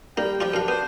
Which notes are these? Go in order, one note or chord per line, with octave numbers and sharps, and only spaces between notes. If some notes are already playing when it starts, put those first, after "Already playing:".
G3 A#3 G5
F3 D4 F4 G5
F#2 D4 F5
B3 C5